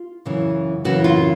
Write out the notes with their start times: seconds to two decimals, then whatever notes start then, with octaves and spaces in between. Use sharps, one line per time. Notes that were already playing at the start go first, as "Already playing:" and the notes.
Already playing: F4
0.25 F#2 C#3 E3
0.85 F#2 C#3 E3 F#4
1.04 F4